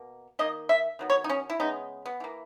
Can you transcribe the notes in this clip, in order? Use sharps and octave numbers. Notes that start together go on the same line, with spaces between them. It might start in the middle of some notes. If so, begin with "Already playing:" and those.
Already playing: B2 A#3
D#3 A#3 D#5
E5
D#3 F#3 B3
C#5
D#4
C#4
E4
C#3 G#3 B3 D#4
B3
E3 A#3